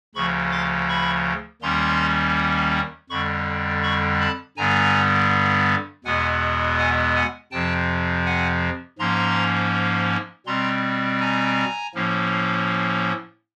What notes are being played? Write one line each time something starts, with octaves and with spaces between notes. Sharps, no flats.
D2 C#3 F3 B5 C#6
C6 D6
B5 C#6
D#2 D#3 G3 A#3 C#4 A#5 C6
F2 D3 G3 B5 C#6
B5 C#6
A5 B5
G2 D3 G3 B3 G#5 A#5
E2 B2 G#3 B3 F#5 G#5
F#5 G#5
F#5 G#5
F2 C3 F3 G5 A5
F#5 G#5
G#2 F3 A#3 C#4 A#5 C6
B2 G3 C4 A#5 C6
G#5 A#5
A2 F3 A#3 C#4